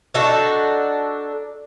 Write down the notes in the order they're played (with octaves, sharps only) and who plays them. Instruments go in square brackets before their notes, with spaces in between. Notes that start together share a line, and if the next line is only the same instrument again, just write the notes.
[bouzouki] D4 D#4 F#4 A4